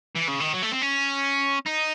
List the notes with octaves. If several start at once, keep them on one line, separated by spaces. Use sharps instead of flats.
E3
C#3
D#3
F#3
A3
C4
C#4
D#4